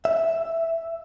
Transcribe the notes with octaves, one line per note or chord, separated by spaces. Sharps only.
E5